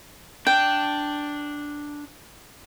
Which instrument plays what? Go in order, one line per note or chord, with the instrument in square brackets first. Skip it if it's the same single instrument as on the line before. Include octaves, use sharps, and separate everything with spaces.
[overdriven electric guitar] D4 [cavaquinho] G5